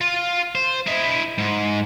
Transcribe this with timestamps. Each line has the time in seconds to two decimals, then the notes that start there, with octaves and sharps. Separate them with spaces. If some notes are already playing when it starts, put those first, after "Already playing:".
0.01 F4
0.55 C5
0.86 E4 D#5
1.38 G#2